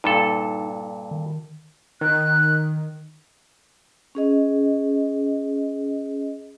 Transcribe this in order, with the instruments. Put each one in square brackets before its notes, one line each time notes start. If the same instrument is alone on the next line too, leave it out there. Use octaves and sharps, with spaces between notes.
[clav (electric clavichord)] G2 A#2 A4 [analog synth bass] D#4
[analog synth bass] D#3
[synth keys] D#3 [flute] F#6
[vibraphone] C#4 G#4 D#5